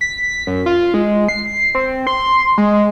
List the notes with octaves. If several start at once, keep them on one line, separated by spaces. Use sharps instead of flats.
B6
F#2
F4
G#3
C7
C4
C6
G#3